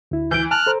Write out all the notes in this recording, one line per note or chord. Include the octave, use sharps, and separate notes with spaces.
D2 E4
E3 G6 D7
G#5 A5 F6 F#6
A4 C5 A#5